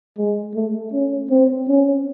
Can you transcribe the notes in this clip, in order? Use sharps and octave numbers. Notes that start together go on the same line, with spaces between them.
G#3
A3
C#4
C4
C#4